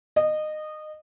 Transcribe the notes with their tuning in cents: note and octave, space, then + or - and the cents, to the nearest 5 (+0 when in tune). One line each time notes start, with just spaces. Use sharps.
D#5 -20